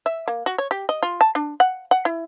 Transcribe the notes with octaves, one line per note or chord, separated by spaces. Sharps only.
E5
A#3
F#4
C#5
G4
D#5
F4
A5
D4
F#5
F#5
E4